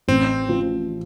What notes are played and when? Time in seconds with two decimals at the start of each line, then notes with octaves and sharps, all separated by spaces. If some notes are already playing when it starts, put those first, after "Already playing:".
0.08 A1 C4
0.49 F3